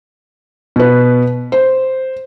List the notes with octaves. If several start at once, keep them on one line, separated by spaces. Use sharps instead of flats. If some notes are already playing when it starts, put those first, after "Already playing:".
B2 B4
C5